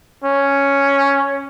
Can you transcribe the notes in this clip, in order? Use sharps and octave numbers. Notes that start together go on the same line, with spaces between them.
C#4